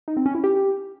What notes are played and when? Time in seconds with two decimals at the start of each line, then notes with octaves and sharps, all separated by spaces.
0.08 D#4
0.17 C4
0.26 C#4
0.35 E4
0.44 G4